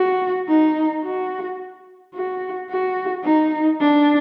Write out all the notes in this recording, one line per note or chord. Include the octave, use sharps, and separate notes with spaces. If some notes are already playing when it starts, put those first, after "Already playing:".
Already playing: F#4
D#4
F#4
F#4
F#4
D#4
D4